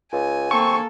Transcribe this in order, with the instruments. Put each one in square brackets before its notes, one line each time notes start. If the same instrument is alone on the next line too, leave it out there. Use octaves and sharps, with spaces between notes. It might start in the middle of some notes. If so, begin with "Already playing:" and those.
[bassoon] C#2 [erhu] G#5
[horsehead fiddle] A#3 A4 [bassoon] C4 [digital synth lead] C#6